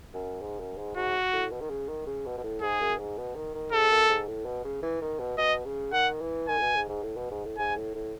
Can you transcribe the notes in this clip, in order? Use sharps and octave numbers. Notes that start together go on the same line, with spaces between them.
F#2
G#2
F#2
G#2
G#2 F#4
A2
B2
D#3
C#3
D#3
C#3
B2
B2
A2
G#2 G#4
F#2
G#2
B2
D#3
D#3
G#2 A4
F#2
G#2
A2
B2
C#3
E3
D#3
B2
B2 D#5
C#3
D#3 F#5
E3
D#3 G#5
A2
B2
G#2
G#2
A2
B2
G#2
A2
G#2 G#5
A2
A2